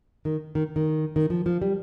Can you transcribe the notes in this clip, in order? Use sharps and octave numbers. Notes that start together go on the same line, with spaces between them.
D#3
D#3
D#3
D#3
F3
F3
G3